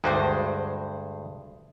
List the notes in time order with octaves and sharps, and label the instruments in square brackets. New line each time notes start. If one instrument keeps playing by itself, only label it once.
[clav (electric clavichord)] D2 G2 G#3 [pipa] G3 F#4 C5